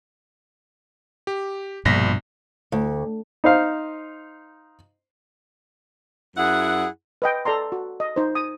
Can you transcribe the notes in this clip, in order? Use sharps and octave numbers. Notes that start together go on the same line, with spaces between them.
G4
A#1 G2 B2 A#6 B6
D2
D#4 C5 F5
F#2 E4 G#4 F#5
B4 D#5 G5
A4 D5 A#5 C6
F#4
D#5
D#4 C5
D#6